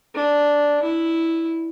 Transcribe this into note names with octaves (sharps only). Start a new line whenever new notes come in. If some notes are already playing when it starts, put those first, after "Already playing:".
D4
E4